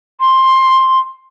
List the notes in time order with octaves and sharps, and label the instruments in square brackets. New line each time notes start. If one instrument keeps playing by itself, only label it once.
[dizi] C6